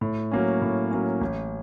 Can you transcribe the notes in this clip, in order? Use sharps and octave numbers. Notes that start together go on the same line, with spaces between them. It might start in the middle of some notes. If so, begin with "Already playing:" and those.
A2
F#3 A#3 C#4
A2
F#3 A#3 C#4
A1